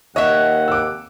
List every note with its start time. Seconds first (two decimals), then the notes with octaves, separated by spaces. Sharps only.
0.16 D#2 C#5 D#5 E5 F#5
0.68 D6 E6